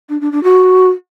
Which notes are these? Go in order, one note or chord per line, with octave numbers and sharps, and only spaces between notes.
D4
D4
D4
F#4